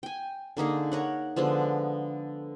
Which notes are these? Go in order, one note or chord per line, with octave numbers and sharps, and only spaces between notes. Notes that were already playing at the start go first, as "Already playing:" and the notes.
G5 G#5
D3 A#3 D#4 G#4
A#4 C#5 F#5
D3 F3 G#3 B3